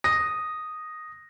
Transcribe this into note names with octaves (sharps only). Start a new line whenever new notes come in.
D#6 A#6